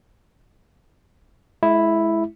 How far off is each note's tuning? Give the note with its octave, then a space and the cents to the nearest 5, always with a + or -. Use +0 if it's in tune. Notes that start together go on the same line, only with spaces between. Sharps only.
G#3 +35 E4 +0